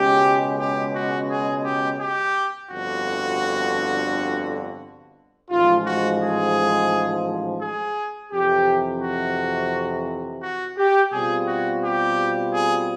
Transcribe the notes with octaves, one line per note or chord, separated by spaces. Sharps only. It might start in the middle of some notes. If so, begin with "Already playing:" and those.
Already playing: C#2 B2 G#3 C#4 G4
G4
F#4
G#4
G4
G4
G1 F2 D3 F#4
A1 G#2 F3 G#3 F4
F#4
G#4
G#4
F2 C3 E3 G4
F#4
F#4
G4
B2 G3 C4 F4 G#4
F#4
G4
G#4